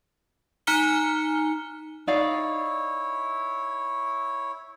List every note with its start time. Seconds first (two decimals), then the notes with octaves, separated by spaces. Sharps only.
0.67 D#4 G#5 A#5 F6 C#7 G7
2.07 D#4 E4 C#5 D5 F5